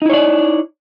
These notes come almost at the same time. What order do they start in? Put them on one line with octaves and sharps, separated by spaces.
D#4 E4 C#5 D5